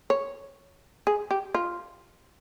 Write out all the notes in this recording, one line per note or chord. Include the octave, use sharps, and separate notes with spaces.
C#5
G#4
G4
F4